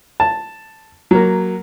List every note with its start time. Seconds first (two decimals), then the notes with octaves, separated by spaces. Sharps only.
0.20 A5
1.11 F#3 A#3